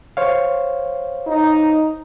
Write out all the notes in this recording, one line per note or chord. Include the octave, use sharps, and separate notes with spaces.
C5 C#5 F5
D#4